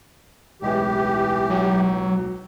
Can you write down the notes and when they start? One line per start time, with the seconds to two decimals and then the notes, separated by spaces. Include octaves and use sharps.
0.62 D1 B1 E3 G#3 G4
1.50 F#3